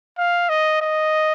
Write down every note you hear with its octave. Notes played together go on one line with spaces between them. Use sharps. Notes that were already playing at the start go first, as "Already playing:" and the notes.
F5
D#5
D#5